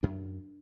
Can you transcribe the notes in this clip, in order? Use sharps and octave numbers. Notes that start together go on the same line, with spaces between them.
F#2 D4